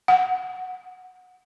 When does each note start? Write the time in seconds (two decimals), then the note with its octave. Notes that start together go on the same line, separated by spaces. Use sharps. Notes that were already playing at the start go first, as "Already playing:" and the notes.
0.08 F#5